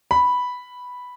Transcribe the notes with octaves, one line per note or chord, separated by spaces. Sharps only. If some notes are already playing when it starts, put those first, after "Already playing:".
B5